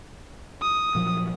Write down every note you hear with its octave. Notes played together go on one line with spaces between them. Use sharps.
D#6
A#2 F3 F#3